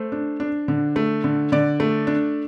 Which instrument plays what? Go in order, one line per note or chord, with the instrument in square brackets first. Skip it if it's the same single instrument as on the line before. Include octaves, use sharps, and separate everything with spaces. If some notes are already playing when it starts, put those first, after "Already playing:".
Already playing: [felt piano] A3 C5
D4
D4
D3
A3
D3
D3 D5
A3
D4